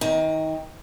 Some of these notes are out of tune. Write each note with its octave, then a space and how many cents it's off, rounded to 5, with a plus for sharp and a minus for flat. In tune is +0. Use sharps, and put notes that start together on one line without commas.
D#3 +30 A#5 +0